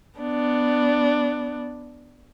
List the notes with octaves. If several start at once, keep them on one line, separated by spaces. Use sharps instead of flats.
B3 D4